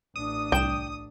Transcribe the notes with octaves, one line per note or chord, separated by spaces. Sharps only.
A1 D4 D#6
C2 G5 E7